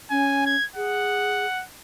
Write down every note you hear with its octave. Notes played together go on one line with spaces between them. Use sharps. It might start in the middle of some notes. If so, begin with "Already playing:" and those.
C#4 G#5
G#6
G#4 F#5